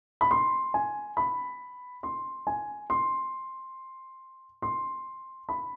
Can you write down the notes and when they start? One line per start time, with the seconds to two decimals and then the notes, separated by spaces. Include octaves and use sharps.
0.21 B5
0.31 C6
0.74 G#5
1.17 B5
2.03 C6
2.47 G#5
2.90 C6
4.62 C6
5.49 B5